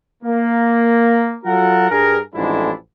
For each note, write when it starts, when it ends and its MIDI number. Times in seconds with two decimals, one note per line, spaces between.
0.23 1.36 58
1.44 1.88 54
1.44 1.88 65
1.44 1.88 66
1.44 1.88 69
1.44 1.88 70
1.44 1.88 78
1.89 2.18 43
1.89 2.18 68
1.89 2.18 70
2.34 2.71 33
2.34 2.71 41
2.34 2.71 44
2.34 2.71 56
2.34 2.71 62
2.34 2.71 64